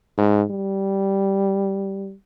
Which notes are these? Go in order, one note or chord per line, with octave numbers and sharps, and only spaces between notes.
G#2
G3